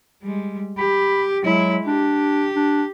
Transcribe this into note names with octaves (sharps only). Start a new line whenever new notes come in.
G3 G#3
G4 B5
F#3 G#3 E4
D4 G4
D4